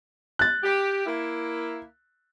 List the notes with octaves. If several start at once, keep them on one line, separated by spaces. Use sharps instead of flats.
F#6 A6
G4
A#3 E4